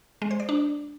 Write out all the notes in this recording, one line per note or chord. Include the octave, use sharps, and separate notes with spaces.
G#3
C5
D5
D4